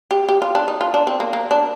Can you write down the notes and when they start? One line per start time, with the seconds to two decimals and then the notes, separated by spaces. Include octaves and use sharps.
0.11 G4
0.29 G4
0.42 F4
0.55 D4
0.68 D#4
0.81 F4
0.94 D4
1.07 C4
1.20 A#3
1.33 A#3
1.51 D4